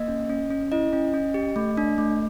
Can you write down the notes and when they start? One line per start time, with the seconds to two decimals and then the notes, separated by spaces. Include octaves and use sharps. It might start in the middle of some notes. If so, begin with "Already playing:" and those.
Already playing: A#3 D#5
0.08 C#4
0.29 C#4
0.50 C#4
0.72 E4 D#5
0.93 C#4
1.14 C#4
1.34 G4
1.56 A3
1.77 D4
1.98 A3